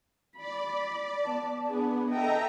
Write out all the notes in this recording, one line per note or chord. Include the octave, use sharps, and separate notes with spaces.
D5 B5
B3 A5
B3 D4 G#4
A4 D#5 E5 G5 A#5